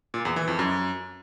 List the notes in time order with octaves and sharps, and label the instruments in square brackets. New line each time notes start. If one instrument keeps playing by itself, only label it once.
[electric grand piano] A#2
E2
E3
F2
F#2